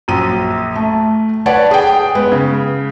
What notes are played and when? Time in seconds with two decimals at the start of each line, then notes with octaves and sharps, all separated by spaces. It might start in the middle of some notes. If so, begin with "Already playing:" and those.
0.08 A#1 F#2 D#7
0.76 A3
1.46 B4 C#5 D5 F#5 A5
1.71 G#4 G5
2.15 G#3 B3
2.32 C#3